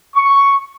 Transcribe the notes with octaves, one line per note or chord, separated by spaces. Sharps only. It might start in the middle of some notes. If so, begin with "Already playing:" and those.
C#6